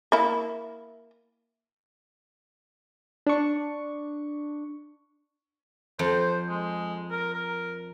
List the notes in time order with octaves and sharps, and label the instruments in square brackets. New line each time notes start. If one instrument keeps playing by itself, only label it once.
[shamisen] A#3 E4
[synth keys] D4 C#6
[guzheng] F2 [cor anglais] C5
[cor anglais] G#3
A#4
A#4